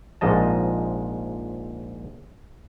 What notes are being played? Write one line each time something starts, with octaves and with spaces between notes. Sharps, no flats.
A#1 G#2 F3 D#5 A5